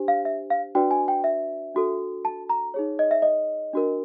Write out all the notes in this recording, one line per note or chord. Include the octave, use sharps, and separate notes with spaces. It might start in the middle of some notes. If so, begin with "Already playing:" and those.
Already playing: D4 G4 C5
F5
E5
F5
D4 F#4 B4 D5 G5
G#5
G5
E5
D4 F#4 A4
A5
A#5
D#4 G#4 C#5
D#5
E5
D#5
D4 F#4 A#4